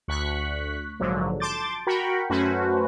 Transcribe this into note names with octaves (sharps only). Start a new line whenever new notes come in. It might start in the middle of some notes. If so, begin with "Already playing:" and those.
D2 C#6 F#6 B6
A#1 G#2 D3 F3 F#3
A5 C6 D6 G6 A6
F#4 A#4 G5 B5 C#6
F#2 A3 C#4 F#4 B4 C5